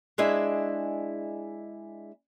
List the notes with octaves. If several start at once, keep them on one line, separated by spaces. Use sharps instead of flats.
G#3 D4 E4 G#4 D#5 E5